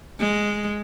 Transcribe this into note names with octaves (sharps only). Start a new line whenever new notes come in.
G#3